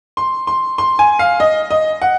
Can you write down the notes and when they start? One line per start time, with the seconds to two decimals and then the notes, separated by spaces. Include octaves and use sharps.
0.17 C6
0.47 C6
0.78 C6
0.99 G#5
1.19 F5
1.40 D#5
1.71 D#5
2.02 F#5